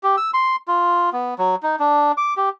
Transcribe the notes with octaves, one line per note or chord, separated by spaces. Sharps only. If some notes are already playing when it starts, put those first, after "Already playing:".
G4
E6
C6
F4
B3
F#3
D#4
D4
D6
G4